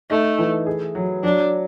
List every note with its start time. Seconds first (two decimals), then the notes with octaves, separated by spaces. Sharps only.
0.10 A3 D#4
0.38 E3
0.66 G#4
0.95 F#3
1.23 F#3 D4